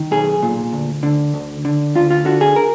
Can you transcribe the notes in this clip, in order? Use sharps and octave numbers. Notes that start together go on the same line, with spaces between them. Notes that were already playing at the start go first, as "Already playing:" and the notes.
Already playing: D#3
B1 G#4
A#2
D2
D3
D2
D3
D2 F4
F4
D3 F#4
G#4
A#4